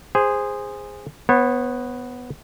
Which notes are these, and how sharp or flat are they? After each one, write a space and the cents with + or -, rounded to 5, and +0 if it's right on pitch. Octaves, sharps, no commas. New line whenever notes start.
G#4 -15 C5 +0
B3 +0 C#5 -40